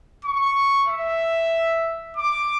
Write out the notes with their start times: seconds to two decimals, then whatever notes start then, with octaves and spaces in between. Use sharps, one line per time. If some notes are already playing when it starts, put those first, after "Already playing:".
0.25 C#6
0.87 E5
2.17 D6